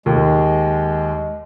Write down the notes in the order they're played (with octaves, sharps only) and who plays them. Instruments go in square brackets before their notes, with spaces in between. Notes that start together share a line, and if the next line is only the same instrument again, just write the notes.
[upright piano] D#2 [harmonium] G#3